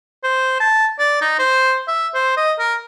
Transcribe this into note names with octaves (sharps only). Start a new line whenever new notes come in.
C5
A5
D5
D#4
C5
E5
C5
D#5
A#4